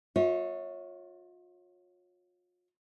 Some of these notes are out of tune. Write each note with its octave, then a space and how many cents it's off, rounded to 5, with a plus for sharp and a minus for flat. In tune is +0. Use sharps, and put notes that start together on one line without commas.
F4 +40 C#5 -5 E5 -40